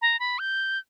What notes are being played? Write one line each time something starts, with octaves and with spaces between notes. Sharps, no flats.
A#5
B5
G6